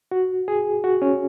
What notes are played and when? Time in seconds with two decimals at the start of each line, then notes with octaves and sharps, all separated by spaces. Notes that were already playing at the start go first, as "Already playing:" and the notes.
0.11 F#4
0.48 G#4
0.84 F#4
1.02 C#4